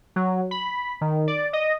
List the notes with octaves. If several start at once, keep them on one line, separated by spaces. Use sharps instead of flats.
F#3
B5
D#3
D5
D#5